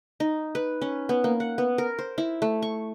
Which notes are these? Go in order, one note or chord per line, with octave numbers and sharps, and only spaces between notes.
D#4
B4
C#4
B3
A#3
F#5
B3
A#4
C5
E4
A3
C#6